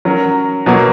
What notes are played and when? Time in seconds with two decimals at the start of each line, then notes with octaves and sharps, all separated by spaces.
0.05 F#3 C#4 F#4 A#4
0.66 B2 F#3 A#3